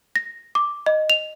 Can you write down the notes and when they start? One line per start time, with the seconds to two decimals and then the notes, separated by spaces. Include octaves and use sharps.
0.16 A#6
0.55 D6
0.86 D#5
1.10 F7